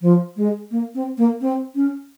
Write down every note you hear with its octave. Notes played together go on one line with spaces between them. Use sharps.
F3
G#3
A#3
C4
A#3
C4
C#4